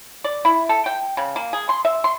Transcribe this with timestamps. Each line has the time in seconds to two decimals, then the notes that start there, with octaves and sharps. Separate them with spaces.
0.24 D5
0.45 E4
0.69 A4
0.86 G5
1.17 C#3
1.36 A#3
1.53 G#4
1.69 C6
1.85 E5
2.04 C6